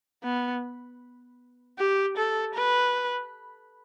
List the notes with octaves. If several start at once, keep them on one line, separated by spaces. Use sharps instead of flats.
B3
G4
A4
B4